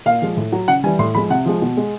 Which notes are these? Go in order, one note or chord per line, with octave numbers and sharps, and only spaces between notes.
A#2 F5
F3 G#3
A2
F#3
C#3 F#5
E3 G3 G#5
A2 C6
F3 G#3 B5
C3 F#5
F3 G#3
B2
G#3